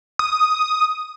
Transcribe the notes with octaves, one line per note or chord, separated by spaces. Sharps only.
D#6